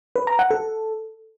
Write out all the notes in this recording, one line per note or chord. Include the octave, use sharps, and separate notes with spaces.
B4
A#5
F#5
A4